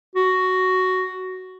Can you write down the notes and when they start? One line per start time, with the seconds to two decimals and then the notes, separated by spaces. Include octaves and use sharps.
0.15 F#4